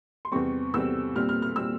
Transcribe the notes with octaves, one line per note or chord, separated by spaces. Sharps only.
C6
E2 C3 G3 C4 C#6
E2 C3 G3 C4 E6
A#2 G3 C4 F6
F6
F6
A#2 G3 C4 E6